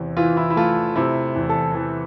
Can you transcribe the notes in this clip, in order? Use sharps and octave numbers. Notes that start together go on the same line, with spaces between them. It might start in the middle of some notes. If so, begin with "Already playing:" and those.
Already playing: E2 C3
E3 F4
E4
E4
A3 F4
C3 E4
E2
A4
E3 A4